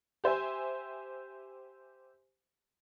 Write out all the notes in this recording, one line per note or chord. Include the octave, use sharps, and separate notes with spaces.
G4 C5 E5 G#5